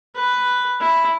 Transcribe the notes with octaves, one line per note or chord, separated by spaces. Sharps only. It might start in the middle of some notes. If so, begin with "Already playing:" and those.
B4
E4